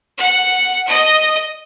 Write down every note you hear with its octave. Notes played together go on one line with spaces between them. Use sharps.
F#5
D#5